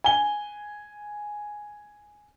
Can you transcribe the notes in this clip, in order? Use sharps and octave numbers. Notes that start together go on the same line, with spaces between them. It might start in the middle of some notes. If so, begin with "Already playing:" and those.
G#5 G7